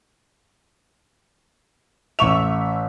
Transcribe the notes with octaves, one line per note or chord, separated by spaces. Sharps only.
A1 E5 C#6 F7